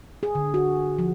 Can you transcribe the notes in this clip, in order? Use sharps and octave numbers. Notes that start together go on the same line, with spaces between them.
G#4
D3
F#4
F3